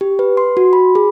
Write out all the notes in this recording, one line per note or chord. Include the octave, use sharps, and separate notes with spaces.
G4
B4
C6
F#4
B5
G#4